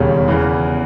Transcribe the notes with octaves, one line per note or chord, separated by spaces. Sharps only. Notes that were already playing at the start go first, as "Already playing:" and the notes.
Already playing: E1 D#2 C#3 G3 C#4
E2 C#3 E3